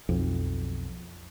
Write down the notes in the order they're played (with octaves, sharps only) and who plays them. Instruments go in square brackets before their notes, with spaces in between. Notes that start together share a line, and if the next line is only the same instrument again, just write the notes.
[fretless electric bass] B1 F2